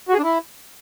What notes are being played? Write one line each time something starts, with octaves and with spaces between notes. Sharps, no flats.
F#4
G#4
D4
E4